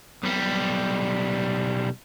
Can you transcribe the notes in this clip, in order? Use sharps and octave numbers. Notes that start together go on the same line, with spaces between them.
B1 G3